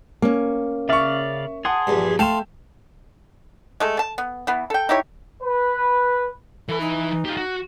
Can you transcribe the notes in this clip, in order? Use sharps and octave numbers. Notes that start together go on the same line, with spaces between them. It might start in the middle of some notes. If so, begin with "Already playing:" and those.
A#3 C#4
C#3 D5 E5 F5 C#6
G#4 F#5 A5 C6 D#6
A#1 E2 G2
A3 A4 F5 G5 C6 E7
G#3 A3 A4
A5
B3
E3 B3
A4 G5
D#4 E4 G4 C#5
B4
E3 A4 B5
D#4
F4 G4
F#4